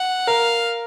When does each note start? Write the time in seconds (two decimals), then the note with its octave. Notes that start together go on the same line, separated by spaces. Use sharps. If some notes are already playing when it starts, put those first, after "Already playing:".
Already playing: F#5
0.27 A#4 F5